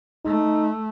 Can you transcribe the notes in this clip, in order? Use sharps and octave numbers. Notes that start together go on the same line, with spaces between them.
A3 D#4